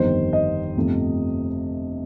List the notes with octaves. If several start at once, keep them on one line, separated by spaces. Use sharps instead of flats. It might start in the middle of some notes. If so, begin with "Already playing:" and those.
Already playing: G1 F2 D#3 G3 C5
D#5
G1 F2 C3 F3 A3